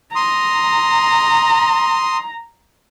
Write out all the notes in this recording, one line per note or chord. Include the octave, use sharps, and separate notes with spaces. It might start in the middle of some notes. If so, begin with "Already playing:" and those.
A#5 C6 D#6